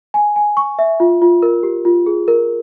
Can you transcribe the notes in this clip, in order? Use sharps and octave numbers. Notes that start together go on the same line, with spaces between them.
G#5
G#5
C#6
E5
F4
F4
A#4
G4
F4
G#4
A#4